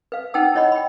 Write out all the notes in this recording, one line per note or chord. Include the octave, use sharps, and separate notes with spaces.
B4 F5
D#4 B4 F#5 G5 A5 E6
E4 C#5 D#5 F#5 B5
G5 B5